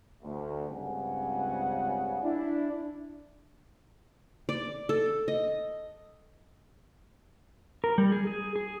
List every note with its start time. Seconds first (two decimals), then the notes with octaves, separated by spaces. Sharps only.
0.23 D2
0.69 C#2 G2 C#3 C4 F#5 G#5
2.23 D4 E4
4.49 D5
4.89 A4
5.28 D#5
7.84 A#4
7.98 G3
8.12 G#4
8.27 G#4
8.56 G#4